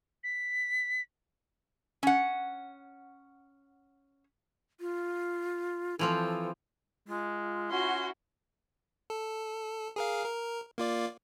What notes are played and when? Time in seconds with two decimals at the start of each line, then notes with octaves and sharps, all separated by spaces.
0.24 B6
2.03 C#4 F#5
4.80 F4
5.99 E3 F3 C4 A4
7.08 G#3 F4
7.71 C#4 E4 F#4 C6
9.10 A4
9.96 G#4 A#4 F5
10.25 A#4
10.78 A#3 F4 D5